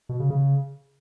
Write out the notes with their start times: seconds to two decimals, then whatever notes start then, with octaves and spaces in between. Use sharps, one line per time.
0.09 B2
0.20 C#3
0.30 C#3